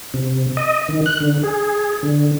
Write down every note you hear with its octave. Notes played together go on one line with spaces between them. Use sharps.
C3
D#5
D#3
F#6
D3
G#4
D3